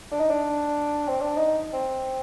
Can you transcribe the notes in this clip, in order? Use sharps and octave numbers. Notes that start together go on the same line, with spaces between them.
D4
D#4
D4
C4
D4
D#4
C4